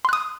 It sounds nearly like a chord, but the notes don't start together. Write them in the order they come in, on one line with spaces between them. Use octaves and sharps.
C6 F#6 D#6